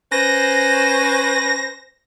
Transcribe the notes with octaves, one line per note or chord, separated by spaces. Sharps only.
C#4 B4 C5 A#6